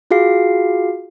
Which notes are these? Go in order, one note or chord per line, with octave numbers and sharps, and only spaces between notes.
F4 F#4 G#4 F5 C7